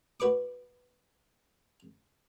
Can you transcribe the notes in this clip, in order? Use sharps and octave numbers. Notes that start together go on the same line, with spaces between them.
F#4 B4 C#6 D6